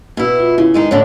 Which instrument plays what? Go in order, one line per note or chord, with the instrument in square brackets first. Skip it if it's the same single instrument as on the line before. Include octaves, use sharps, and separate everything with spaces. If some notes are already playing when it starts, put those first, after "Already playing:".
[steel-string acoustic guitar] B2 E4
[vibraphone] F4
[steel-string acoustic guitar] C#3 [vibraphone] E4
[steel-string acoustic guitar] D#3 G#3 D#4
[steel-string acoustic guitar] A2 D3 D4 [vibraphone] C#5